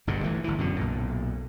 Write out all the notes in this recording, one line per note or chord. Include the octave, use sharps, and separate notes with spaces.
G1 G2 B2 D3
E3 A3
G1 E3
F#2 B2 D3
B1 A#2